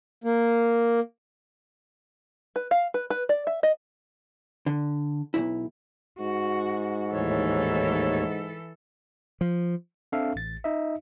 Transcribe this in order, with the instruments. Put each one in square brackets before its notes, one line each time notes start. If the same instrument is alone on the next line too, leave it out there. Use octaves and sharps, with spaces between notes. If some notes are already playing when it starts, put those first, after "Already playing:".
[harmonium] A#3
[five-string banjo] B4
F5
B4
B4
D5
E5
D#5
[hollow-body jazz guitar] D3
B1 G2 E4
[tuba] G#2 [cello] F#4
[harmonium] D#2 A2 C#5 [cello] E3 A4
[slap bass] F3
[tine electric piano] C4 D4 A4 E5 F5
A1 A6
D#4 D#5 E5